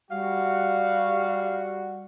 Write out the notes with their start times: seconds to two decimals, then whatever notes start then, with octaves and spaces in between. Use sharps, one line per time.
0.11 G3 F#4 F5